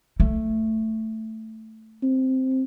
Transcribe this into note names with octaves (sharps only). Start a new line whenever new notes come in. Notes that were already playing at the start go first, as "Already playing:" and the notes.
A3
C4